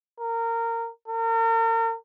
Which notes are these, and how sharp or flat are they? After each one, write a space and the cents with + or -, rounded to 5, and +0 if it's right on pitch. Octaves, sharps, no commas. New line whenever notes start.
A#4 -20
A#4 -40